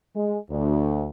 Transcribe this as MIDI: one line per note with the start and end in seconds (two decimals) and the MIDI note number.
0.16 0.38 56
0.50 1.08 38